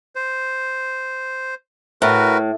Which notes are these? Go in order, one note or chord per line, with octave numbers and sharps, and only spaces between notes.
C5
A2 F#4 A#4 B4